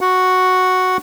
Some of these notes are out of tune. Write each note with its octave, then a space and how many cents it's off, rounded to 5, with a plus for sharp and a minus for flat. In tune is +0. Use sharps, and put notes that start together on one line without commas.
F#4 +0 F#5 +0